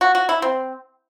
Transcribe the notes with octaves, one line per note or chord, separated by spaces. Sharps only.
F#4
F#4
E4
C4